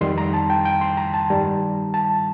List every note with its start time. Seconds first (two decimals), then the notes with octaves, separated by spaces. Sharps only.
0.01 F2 D#3 G3 C6
0.18 A#5
0.34 A5
0.50 G5
0.65 G5
0.81 C6
0.97 A#5
1.14 A5
1.30 G2 D#3 G3
1.94 A5